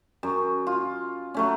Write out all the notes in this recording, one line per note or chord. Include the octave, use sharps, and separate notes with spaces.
F#2
F4
F#3 A3 C#4